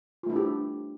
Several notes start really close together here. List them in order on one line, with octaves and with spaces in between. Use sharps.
F4 A3 E4 D4 G4